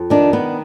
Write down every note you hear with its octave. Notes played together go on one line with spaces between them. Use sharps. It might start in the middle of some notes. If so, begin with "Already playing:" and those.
Already playing: F2
D#3 D4
B3